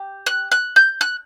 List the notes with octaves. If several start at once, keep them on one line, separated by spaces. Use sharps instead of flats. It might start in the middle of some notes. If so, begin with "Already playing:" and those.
Already playing: G4
F#6
F#6
G6
F#6